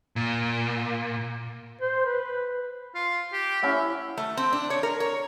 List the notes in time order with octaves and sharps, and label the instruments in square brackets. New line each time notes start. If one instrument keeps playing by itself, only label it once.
[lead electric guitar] A#2
[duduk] C5
B4
[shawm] F4
G4
[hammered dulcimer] C#4 E4 F#5 [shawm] E5
[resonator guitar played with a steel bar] A3
C4
D4
C#5
A#4
C#5